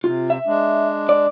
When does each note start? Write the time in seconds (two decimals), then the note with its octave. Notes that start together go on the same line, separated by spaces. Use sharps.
0.04 C3 F4
0.30 E5
0.47 G#3 D4
1.09 D5